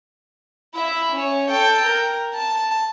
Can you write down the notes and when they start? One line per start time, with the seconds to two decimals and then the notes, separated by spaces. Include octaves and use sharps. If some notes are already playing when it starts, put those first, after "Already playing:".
0.74 E4 E5
1.12 C#4 C#5
1.51 A4 G5
1.85 A#4
2.34 A5